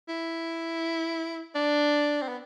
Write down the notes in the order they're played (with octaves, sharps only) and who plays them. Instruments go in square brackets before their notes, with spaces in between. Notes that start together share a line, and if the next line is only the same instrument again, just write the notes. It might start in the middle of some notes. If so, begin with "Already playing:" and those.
[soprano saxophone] E4
D4
C4
B3